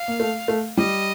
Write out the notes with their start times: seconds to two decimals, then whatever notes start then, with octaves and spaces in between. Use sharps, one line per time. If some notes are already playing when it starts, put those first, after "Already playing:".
Already playing: F5
0.08 A#3
0.20 A3
0.48 A3
0.77 G3 D#5